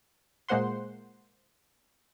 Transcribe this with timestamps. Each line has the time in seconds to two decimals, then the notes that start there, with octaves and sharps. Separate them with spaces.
0.49 A#2 G#3 A#3 C5 F#5 C6